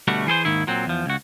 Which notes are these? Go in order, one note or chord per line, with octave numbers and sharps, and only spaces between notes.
D2 B2 G3 A3 F#4
E3 G#4 A4 C5
D#2 G#2 D#3 E4
A#2 F#3 C4
E2 F3
C#2 F#4